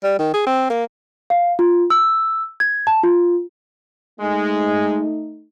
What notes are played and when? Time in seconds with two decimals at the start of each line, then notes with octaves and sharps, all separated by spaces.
0.03 G3
0.19 D#3
0.34 G#4
0.47 C4
0.70 A#3
1.30 F5
1.59 F4
1.90 E6
2.60 G#6
2.87 A5
3.03 F4
4.20 G#3 A3 D#4